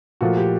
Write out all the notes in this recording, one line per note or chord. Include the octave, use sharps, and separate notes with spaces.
A#2 F3 A3 F#4
G4